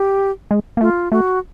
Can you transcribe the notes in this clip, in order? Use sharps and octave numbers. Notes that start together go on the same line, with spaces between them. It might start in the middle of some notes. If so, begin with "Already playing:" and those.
Already playing: G4
G#3
A#3
A3 F4
A3 F#4